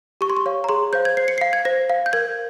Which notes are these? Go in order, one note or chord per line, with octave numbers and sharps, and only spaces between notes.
G4 C#6
C6
C#6
C#5 F5
A#5
G#4 C6
C5 F5 G6
G#6
C5 C7
C#7
F5 C7
G#6
C5 A#6
F5
G6
A#4 G#6